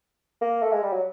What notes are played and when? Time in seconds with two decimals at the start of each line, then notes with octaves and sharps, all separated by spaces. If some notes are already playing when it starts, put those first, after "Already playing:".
0.42 A#3
0.63 A3
0.72 G#3
0.82 G3
0.93 F#3